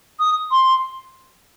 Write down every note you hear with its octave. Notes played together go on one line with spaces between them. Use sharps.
D#6
C6